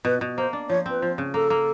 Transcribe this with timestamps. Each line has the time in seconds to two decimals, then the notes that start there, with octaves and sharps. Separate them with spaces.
0.05 B2 B4
0.21 B2
0.37 A#3 C5
0.53 D4
0.69 F3 C#5
0.86 C4 B4
1.02 F3 C5
1.18 C#3
1.34 A#3 A4
1.50 A#3